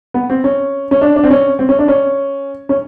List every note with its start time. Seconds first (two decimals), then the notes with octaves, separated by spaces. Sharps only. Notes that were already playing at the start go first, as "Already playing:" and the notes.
0.14 B3
0.30 C4
0.44 C#4
0.91 C#4
1.01 D4
1.16 D4
1.23 C4
1.31 C#4
1.59 C4
1.69 C#4
1.79 D4
1.88 C#4
2.69 C#4